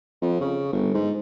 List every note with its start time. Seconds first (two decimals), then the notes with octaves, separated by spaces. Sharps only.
0.22 F2
0.41 C#3
0.73 G1
0.94 G#2